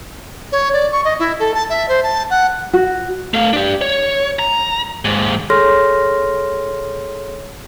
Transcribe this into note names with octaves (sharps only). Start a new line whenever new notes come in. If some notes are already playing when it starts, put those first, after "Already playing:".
C#5
D5
C#6
D#5
E4
A4
A5
E5
C5
A5
F#5
F#4
A3 F5
D4 G4
C#5
A#5
D#2 G#2
G#4 A4 C#5 C6 F6 A#6